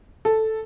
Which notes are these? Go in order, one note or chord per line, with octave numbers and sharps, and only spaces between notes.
A4